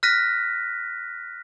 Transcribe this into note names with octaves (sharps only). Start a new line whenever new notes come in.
F6 F#6 A#6 B6 D#7